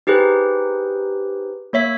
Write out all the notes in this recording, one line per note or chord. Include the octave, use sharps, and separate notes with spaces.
D#4 G4 G#4 B4 C5
A#3 C#5 E5 B6